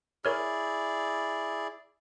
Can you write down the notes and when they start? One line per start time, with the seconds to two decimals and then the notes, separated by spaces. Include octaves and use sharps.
0.25 E4 G#4 A#4 C#5 D5 F6